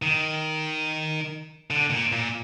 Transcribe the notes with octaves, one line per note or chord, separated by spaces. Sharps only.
D#3
D3
A#2
A#2